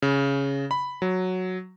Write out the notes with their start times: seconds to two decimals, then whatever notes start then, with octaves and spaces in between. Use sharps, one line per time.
0.02 C#3
0.71 B5
1.02 F#3